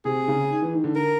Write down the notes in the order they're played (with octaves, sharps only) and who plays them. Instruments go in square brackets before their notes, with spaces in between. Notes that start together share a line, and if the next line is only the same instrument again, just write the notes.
[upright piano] C3 [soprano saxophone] G#4
[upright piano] C#3
D#3
E3
D#3
D3
[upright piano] D3 [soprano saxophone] A#4